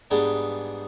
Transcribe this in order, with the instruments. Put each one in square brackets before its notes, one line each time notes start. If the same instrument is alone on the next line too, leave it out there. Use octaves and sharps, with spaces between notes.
[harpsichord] G#2 G3 B3 D4 G#4